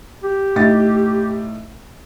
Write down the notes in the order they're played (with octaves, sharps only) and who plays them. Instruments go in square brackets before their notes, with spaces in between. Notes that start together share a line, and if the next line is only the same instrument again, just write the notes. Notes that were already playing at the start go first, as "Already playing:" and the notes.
[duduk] G4
[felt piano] A2 D#4 A6